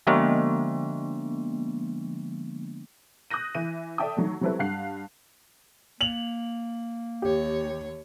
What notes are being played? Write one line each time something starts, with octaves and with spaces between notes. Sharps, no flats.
D3 F3 G#3 A#3 B3 D4
D#6 F#6 G6 A#6 D#7
E3 E5 D#7
A4 D5 E5 G5 A5 D#6
D#3 F#3 A3
F#3 G3 C4 E4 A4 B4
G2 F5 F#5 F#6 C7
A#3 F7 F#7
D#2 G4 C#5